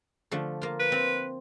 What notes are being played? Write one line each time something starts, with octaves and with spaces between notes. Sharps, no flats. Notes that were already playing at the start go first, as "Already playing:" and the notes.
D3 F3 A3
A#3 F4
B4
C4